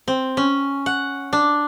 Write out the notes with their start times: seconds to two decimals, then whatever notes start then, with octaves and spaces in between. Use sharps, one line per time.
0.08 C4
0.37 C#4
0.86 F#5
1.33 D4